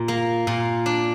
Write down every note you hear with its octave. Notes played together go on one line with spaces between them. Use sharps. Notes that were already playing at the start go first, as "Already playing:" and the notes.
Already playing: A#2
A#3
A#2
D4